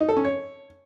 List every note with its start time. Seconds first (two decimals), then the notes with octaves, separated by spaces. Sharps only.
0.01 D#4
0.09 A4
0.17 C#4
0.25 C#5